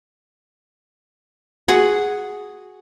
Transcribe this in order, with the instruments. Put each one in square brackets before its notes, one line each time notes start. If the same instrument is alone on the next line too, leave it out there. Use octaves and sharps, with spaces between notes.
[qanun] F#4 G#4 F#5